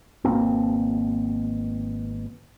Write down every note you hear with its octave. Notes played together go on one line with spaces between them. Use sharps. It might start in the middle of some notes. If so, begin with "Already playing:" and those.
G#1 B2 A#3 C4